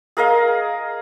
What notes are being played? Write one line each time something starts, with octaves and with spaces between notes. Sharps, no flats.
G#4 A#4 D#5 F5